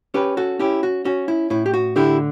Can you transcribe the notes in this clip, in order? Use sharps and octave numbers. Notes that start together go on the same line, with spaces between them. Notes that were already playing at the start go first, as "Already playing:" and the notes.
C#4 G4 B4
F#4 A4
C#4 E4 G4
F#4
C#4 F#4
E4
A2 E4
G4
F#4
D3 E4 G4